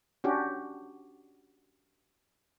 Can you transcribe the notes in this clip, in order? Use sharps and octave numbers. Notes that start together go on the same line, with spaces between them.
C#4 D4 F#4 G4